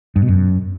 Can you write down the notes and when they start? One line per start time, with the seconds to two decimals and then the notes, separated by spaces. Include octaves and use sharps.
0.16 G2
0.22 B2
0.28 F#2